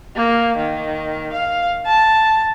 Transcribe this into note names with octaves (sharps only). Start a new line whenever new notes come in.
A#3
D#3
F5
A5